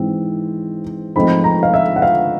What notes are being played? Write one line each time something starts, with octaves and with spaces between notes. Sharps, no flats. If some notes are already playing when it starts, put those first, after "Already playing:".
Already playing: G#2 E3 G#3 C4
G#2 F3 A3 C4 D#4 B5
A#5
F5
E5
F#5
F5